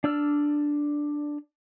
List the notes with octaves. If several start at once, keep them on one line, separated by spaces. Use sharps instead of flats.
D4 D5 E6 F6